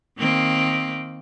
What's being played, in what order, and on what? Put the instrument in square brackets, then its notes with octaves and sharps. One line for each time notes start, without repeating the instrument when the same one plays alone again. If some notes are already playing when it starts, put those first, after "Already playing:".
[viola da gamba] D#3 A#3 C4